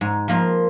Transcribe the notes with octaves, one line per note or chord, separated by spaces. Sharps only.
G#2
F3 A#3 F4